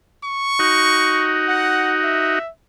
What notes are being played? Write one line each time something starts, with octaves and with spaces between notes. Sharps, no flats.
C#6
D#4 F#4
F#5
E5